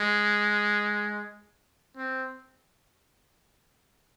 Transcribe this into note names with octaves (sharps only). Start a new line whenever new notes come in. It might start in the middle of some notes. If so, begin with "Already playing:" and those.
Already playing: G#3
C4